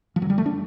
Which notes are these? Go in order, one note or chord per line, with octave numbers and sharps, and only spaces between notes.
F3
F#2 D3 F#3 G3
A3
D4